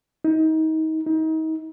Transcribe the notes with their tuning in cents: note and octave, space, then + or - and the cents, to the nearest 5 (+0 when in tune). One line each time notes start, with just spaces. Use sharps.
D#4 +30
D#4 +35